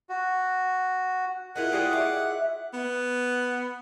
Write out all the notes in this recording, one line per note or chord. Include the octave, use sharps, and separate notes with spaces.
F#4
G#3 E4 F4 A#4 F#5
G4 G#4 D5 D#5
F#4 E5 D6
B3